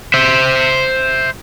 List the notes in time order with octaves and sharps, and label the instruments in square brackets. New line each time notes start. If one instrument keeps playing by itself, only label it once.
[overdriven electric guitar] C5 E5